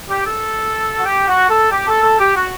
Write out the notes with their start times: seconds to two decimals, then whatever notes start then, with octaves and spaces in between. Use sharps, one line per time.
0.09 G4
0.25 A4
0.99 F#4
1.05 G4
1.28 F#4
1.49 A4
1.70 G4
1.87 A4
2.03 A4
2.19 G4
2.35 F#4